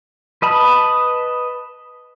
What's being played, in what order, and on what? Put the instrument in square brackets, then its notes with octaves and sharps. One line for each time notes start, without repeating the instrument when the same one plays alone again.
[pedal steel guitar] B4 D#5 A5 B5